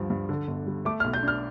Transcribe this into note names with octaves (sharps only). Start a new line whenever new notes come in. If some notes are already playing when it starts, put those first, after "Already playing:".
Already playing: D2 G2 F3
G2
D3
G1
G3
A3 D6
F6
B1
G6
D4 F6